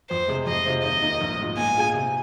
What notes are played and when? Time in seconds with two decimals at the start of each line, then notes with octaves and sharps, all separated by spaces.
0.10 F2 C5
0.28 C3 G#3
0.47 F2 D#5
0.65 C3 G#3 F4 C5
0.83 D#2 D#5
1.02 D#3 A#3 D#4
1.21 A#1
1.39 G#2 F3
1.57 A#2 G#5
1.76 G#3 F4 G#4
1.94 C3